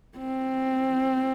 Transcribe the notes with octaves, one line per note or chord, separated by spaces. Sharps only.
C4